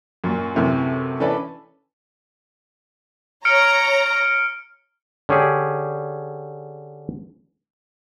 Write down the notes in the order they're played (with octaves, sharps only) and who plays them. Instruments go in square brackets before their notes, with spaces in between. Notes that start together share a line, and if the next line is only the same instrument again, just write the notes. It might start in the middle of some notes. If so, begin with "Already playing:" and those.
[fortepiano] F#2 A#2
F#2 A2 C3 E3
E3 C#4 D4 A4 B4 D5
[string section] C#5 A#5 [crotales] F6 C#7 D7
[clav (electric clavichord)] D3 C#4 G4 G#4